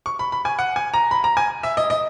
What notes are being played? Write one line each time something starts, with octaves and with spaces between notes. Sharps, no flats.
C#6
B5
B5
G#5
F#5
G#5
A#5
B5
A#5
G#5
E5
D#5
D#5